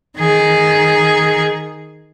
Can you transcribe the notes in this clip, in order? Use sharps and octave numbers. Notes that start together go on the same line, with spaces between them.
D#3 G#4